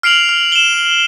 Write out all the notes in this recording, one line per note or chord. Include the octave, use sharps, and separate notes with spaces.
F6 C7 D7 F7 F#7
F6
E7 G7